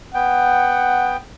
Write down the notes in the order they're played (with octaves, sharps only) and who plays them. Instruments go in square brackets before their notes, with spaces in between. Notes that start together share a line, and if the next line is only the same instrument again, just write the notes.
[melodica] B3 G5 [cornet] F#5